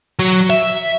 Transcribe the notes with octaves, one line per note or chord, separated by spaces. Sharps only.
F#3
E5